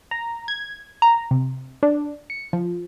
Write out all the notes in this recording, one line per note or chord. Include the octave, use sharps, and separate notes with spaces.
A#5
G#6
A#5
C3
D4
C#7
F3